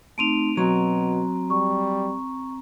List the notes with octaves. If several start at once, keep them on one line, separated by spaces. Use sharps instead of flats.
A3 C4 D#4 D7 D#7 F7
B2 F#3 C4 A#5
G3 C#6